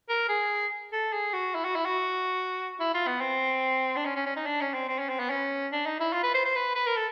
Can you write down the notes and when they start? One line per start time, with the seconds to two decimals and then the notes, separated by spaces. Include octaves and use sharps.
0.09 A#4
0.29 G#4
0.92 A4
1.13 G#4
1.33 F#4
1.55 E4
1.65 F#4
1.75 E4
1.86 F#4
2.80 E4
2.94 F4
3.07 B3
3.21 C4
3.96 D4
4.06 C#4
4.16 C#4
4.26 C#4
4.36 D#4
4.46 D4
4.61 C#4
4.74 C4
4.88 C4
4.99 C#4
5.09 C4
5.19 B3
5.30 C#4
5.72 D4
5.86 D#4
6.00 E4
6.13 F4
6.23 B4
6.34 C5
6.45 C5
6.56 B4
6.75 B4
6.86 A#4
6.96 A4